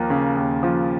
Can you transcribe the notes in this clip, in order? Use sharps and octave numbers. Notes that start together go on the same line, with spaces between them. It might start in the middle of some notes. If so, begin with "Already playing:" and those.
Already playing: D#2 F3 A#3
C#3
D#2
F3